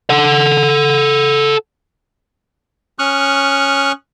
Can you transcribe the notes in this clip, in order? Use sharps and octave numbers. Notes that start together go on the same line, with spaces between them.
A4 F#5
C#4 C#6 D#6 F6 F#6